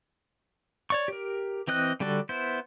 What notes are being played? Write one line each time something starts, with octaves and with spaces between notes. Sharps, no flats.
C#5 D5 C#6
G4 A#4
E3 C4 D#5 F#6
D3 G3 D4 F#4 A4
B3 E4 C5